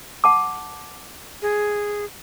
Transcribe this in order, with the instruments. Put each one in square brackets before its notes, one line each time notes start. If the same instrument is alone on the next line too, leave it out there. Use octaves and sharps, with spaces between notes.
[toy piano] F#5 A5 D6
[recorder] G#4